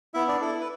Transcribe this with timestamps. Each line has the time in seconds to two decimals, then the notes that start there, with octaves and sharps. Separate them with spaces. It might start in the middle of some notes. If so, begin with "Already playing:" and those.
0.14 B3 E4 E5
0.27 D4 D5
0.41 E4 A4
0.60 B4